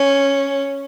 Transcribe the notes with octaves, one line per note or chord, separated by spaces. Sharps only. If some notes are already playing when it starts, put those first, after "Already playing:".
Already playing: C#4